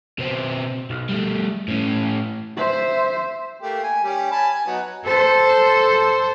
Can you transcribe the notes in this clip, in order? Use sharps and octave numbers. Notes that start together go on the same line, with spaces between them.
B2 C4
B1
G3 A3
A2 C#4
C5 E5
A3 A#3 G4
G#5
G3 C#4 G4
G#5 A5 B5
G#5
F#3 B3 D#4
A4 C5